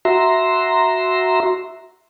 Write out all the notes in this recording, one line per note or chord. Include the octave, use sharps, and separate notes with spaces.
F#4 E5 A#5 C6